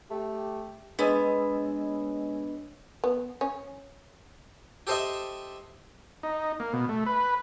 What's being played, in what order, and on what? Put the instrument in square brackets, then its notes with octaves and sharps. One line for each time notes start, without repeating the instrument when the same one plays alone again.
[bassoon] A3 [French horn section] G4
[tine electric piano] G#3 G#5 E6 [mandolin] B3 [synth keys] D4 C#5 D#5
[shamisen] B3
C#4
[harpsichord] G4 A4 C5 D#5 E5
[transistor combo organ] D#4
A#3
B2
A3
B4